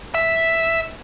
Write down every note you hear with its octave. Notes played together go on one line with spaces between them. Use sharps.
E5